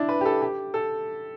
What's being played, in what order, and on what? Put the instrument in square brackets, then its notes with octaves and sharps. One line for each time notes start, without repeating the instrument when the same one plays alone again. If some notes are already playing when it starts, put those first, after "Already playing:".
Already playing: [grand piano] D4 E4
B4
G4
A4
G4
A4